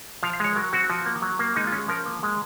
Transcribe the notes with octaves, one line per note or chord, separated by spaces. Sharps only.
F3 F5
F5
G#3 C#5
F#3 A#4
C4 F#4
F3
A#3
F#3
A#3
G#3 D#4
F4
C#4
G#4
F3 A#4
A#3
G#3